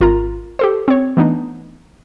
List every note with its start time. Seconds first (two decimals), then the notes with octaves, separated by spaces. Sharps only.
0.01 G#1 F4 A#4 A#5
0.59 G4 A4 C5
0.88 C4 C#5
1.17 E3 A3 B3 D4 D#4